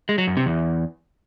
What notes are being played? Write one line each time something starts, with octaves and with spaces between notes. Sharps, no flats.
G#3
F#3
F#2
C3
E2